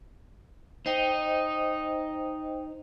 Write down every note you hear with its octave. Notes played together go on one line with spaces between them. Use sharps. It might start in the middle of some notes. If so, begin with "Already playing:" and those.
D#4 C5 D#5 G5